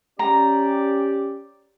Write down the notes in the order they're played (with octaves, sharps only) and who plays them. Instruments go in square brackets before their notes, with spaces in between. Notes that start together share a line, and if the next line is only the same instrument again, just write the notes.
[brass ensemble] C#4 G4 D5 [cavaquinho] A#5